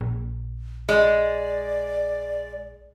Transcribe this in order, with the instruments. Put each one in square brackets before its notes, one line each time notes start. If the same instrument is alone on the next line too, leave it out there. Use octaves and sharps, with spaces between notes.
[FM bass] A#1
[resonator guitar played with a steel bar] G#3 [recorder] D5